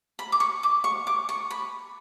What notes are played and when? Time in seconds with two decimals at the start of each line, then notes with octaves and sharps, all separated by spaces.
0.19 B5
0.32 D6
0.40 C#6
0.63 D6
0.84 C#6
1.07 D6
1.29 C#6
1.51 B5